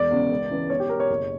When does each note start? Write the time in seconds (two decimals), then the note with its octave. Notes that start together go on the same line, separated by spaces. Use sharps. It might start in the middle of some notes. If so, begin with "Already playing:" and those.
Already playing: E1 D5
0.10 E2 C#3
0.30 C#2
0.50 C#3 E3
0.70 B1 C#5
0.80 G4
0.89 B2 A#4
1.00 C#5
1.10 F#1